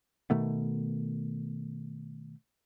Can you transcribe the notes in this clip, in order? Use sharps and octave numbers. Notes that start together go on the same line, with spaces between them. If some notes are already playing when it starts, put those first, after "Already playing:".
B2 D#3 A3 B3